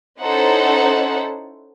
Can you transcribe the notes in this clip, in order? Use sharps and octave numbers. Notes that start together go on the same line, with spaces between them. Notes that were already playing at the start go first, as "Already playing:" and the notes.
C#4 D#4 E4 A4 C5 F#5